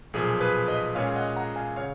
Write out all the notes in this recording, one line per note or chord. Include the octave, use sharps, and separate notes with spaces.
B1 A#2 F3 G#4
G#4 B4
B4 D#5
A#2 G#3 C#4 F4 C#5 F5
D#5 F#5
F#5 A#5
F5 G#5
C#3 C#5 F5